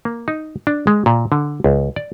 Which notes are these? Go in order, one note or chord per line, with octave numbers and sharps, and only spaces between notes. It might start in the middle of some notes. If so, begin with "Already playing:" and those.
A#3
D#4
D4
G#3
A#2
D3
C#2
D5